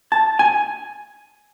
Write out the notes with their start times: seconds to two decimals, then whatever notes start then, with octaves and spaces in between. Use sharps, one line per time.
0.12 A5
0.39 G#5